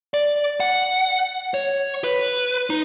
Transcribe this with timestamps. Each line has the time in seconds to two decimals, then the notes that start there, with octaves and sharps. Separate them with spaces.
0.14 D5
0.60 F#5
1.54 C#5
2.04 B4
2.70 D#4